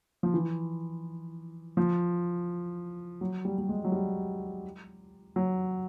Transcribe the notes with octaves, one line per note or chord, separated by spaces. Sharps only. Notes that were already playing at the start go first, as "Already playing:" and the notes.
F3
E3
F3
F#3
G3
G3
G#3
F#3
G3
F#3